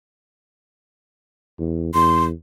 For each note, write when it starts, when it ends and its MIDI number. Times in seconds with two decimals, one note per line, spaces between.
1.58 1.91 40
1.94 2.32 40
1.94 2.23 84